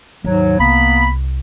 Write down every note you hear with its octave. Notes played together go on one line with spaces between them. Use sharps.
D#2 G#2 F#3
C2 A#3 B3 B5